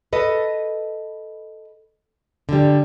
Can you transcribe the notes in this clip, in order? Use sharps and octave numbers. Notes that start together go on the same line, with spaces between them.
A4 B4 D#5
D3 G3